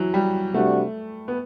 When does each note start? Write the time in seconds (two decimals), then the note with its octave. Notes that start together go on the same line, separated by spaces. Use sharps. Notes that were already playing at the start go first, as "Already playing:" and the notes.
Already playing: E3 F#3
0.14 G3
0.54 C3 G3 A3 D4 F#4
1.28 B3